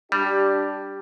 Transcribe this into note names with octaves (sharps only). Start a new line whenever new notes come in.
G3 D4 G4